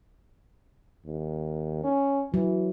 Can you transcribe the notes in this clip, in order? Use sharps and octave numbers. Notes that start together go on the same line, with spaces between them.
D#2
C#4
E3 F#3